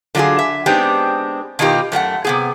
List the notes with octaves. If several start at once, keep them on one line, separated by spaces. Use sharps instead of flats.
D3 F#3 C#4 E4 F4 G#4
E5
G#3 B3 C4 D4 D#4 G4
B2 D#3 D#4 F4 G4
F#2 A3 F#4 F#5
C3 B3 G#4